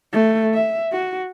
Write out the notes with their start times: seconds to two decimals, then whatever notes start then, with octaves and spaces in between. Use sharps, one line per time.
0.13 A3
0.54 E5
0.92 F#4